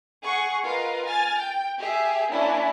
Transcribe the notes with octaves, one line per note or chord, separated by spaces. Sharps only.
G#4 F#5 C#6
F4 A#4 B4 D#5 F5
G#5 F6 A6
G5
G4 G#4 E5
A#3 C#4 D4 E4